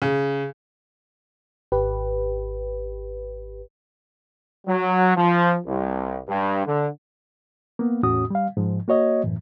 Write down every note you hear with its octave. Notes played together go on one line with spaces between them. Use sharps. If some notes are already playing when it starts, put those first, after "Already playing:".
C#3
G#1 G4 B4
F#3
F3
C2
G2
D3
A#3 B3
E2 A2 C#4 F#4 D#6
G3 F5
G#2 F3
A#3 F#4 C#5 D#5
F#2 A2 E3